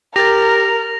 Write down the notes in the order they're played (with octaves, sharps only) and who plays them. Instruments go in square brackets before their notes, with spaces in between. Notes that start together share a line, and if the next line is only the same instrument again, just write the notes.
[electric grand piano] G4 A6 [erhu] A#4 [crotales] A#6 F7